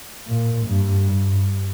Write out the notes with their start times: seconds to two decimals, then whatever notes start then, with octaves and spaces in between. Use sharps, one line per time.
0.27 A#2
0.67 G2
1.07 G2